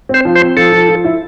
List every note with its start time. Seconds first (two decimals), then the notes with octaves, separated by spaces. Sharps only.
0.09 C4 C5
0.25 F3
0.36 C5
0.41 C4
0.56 F3 A4
0.72 F3
0.89 F3
1.04 E4